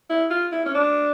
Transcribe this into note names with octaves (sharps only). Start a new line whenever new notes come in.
E4
F4
E4
C#4
D4